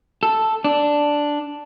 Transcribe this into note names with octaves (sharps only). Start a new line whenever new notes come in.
A4
D4